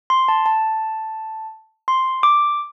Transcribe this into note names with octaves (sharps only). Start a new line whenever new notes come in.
C6
A5
A5
C6
D6